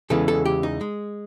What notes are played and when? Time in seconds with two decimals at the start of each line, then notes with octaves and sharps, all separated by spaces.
0.10 E2 C#3 E3 G#3 A4
0.28 A4
0.46 G4
0.63 D#4
0.81 G#3